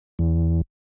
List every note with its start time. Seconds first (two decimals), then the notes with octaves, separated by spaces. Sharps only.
0.19 E2